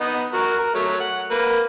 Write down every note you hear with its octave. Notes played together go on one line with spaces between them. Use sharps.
B3 D#4
F#4 A#4
A#4
F#3 A3 C#5
F#5
A#3 B4